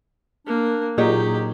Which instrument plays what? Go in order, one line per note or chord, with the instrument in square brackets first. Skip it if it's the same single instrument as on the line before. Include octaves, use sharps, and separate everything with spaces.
[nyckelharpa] A#3 [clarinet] D4
[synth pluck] A#2 [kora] F#3 D#4 [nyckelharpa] G4 [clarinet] G#4